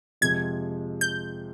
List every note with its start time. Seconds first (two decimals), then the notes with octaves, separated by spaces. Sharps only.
0.21 F2 C3 F3 G#3 G#6
1.01 G6